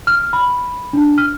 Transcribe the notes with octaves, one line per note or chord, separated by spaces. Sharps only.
F6
B5
D4
F6